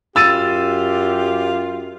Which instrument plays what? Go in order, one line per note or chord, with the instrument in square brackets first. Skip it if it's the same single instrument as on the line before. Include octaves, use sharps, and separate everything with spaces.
[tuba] F#2 [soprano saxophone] F4 [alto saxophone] G4 [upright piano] E6 A6 D#7